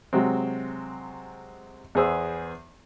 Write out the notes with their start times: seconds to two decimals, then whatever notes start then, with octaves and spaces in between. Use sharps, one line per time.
0.13 C3 F#3 G#3 C4
1.95 E2 B3 G#4 C5 E6